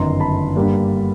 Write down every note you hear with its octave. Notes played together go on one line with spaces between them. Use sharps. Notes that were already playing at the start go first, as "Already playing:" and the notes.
Already playing: G1 F#2 D#3 A#5 C6
A5 B5
G2 D3 G3 A#3 D4